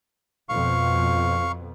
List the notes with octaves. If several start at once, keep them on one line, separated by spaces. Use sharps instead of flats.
F2 B2 F5 C#6